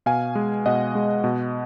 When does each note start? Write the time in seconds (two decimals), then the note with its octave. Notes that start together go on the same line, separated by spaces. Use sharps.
0.06 B2 F5 G#5
0.35 G#3
0.66 B2 D#5 F#5
0.95 G#3
1.24 B2